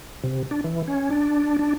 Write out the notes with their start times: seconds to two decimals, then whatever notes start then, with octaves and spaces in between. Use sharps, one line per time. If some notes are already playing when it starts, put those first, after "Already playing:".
0.24 C3
0.51 D4
0.64 E3
0.88 C#4
1.10 D4
1.59 D4